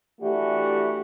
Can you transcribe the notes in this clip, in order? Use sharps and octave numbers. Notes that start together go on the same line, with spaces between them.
E3 A3 D4 F#4 G4